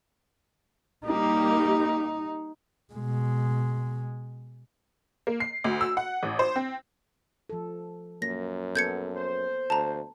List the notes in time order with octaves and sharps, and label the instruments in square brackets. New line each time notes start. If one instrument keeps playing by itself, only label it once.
[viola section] G3 A#3 G4 [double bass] D#4
[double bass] B2 G#3
[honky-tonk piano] A#3
C7
D2
E6
F#5
A1
C5
C4
[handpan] F3 A4
[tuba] F#2 [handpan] A#3 [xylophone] A#6
[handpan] B3 A4 [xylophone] G6 G#6 C#7
[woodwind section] C5
[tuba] D2 [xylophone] A5 A#5